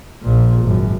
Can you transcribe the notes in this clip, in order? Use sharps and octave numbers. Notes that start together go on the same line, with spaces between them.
A#1 A#2
G#1 F#2